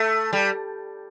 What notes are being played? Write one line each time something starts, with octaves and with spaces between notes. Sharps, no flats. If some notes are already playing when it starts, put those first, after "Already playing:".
Already playing: A3
G3